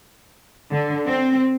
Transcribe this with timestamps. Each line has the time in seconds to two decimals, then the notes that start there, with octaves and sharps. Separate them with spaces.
0.72 D3
1.07 C4